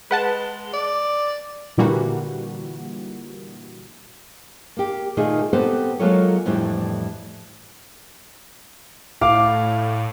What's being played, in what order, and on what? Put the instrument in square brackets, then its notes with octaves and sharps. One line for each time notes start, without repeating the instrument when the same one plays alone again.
[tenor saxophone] G#3 [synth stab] B4 F#5 A5
[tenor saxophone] D5
[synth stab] A#2 D3 E3 G3 A#3 F#4
[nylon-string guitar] A#3 G4
A#2 D#3 A3 D#4 F4 G#4
B3 C4 G4 A4 B4 C5
F#3 G#3 A#3 F4 A4 C#5
F2 A2 E3 G3 D4
[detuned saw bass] A2 [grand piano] F5 D6